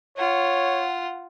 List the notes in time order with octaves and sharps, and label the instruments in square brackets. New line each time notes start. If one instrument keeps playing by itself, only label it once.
[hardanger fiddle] F4 F#5 [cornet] C#5